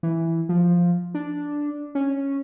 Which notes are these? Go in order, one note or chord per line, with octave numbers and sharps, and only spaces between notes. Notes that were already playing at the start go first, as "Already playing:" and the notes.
E3
F3
D4
C#4